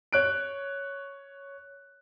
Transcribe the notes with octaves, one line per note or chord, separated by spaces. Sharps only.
C#5 F#6 D7